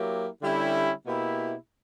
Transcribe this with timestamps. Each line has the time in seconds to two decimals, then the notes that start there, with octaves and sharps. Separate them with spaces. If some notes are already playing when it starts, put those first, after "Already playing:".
Already playing: F#3 A#3 E4 G4
0.41 D3 G3 C#4 E4 G4
1.04 B2 A#3 E4 G4